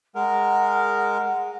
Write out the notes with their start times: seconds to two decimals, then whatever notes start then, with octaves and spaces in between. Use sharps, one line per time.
0.15 G#3 A#4 F#5